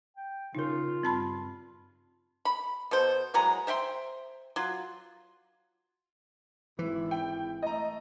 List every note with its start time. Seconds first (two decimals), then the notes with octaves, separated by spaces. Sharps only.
0.17 G5
0.55 C#3 D#4 F4 A#4
1.03 G2 C4 A5 B5
2.45 B5
2.91 B2 A4 C5
3.34 E3 F#3 G#3 A#5
3.67 C5 E5 G5 C6
4.56 F#3 F4
6.79 G#1 E3 E4
7.11 G5
7.62 A3 D#5 A#5